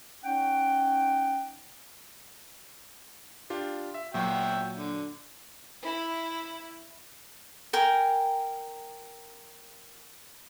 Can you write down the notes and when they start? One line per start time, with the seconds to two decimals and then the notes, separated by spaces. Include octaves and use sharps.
0.23 C#4 D#4 F#5 G5
3.50 D4 F4 G4
3.94 E5
4.14 A#2 F#3 F#4 E5 G5
4.75 D3
5.82 E4
7.73 A#4 G5 G#5